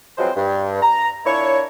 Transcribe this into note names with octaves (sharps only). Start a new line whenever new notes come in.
F3 F#3 G#3 C4 B4 C5
G2
A#5
A#2 D4 E4 C#5